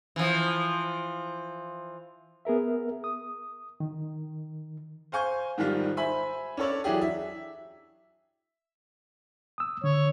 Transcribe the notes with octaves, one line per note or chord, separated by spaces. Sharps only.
E3 F3
B3 G#4 A#4 E5
D#6
D#3
C5 F5 G#5 C#6 G6
G#2 D#3 F3 G3 F4
C5 E5 G#5 B5
C#4 D4 A4 C#5 D5
E3 F#3 D4 E4 G4 G#4
E5
D#6 E6
D3 C#5